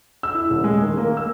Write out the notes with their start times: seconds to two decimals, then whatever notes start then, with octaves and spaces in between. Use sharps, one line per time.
0.23 E6
0.35 E4
0.50 D#1
0.64 G#3
0.82 D#3
0.97 A#3
1.17 E6